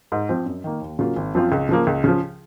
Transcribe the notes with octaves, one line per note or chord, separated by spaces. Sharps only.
G#2
F3 C4
F#2
D#3 A#3
D#2
C#3 F#3 A#3 F4
G#1
F#2 F3 C4 F4
C#2
C#3 F3 A#3
C#2
C#3 F3